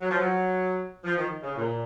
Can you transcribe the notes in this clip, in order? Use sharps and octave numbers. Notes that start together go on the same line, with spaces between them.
F#3
F3
F#3
F3
D#3
C#3
A#2